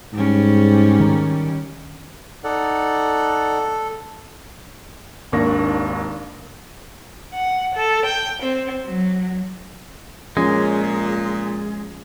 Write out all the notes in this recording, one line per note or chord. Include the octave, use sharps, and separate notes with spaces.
G#2 G3 C#4
D#3
D#4 A4 D5 F#5
G#1 D#2 A#3 D4 C#6 A#6
F#5
A4
G5
C4
F#3
A#2 F3 G#3 C#4